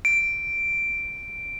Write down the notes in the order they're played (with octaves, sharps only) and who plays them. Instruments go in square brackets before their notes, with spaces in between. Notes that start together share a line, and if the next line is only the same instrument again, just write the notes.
[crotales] D7